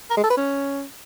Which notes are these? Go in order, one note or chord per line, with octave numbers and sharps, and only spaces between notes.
A#4
G#3
A4
B4
C#4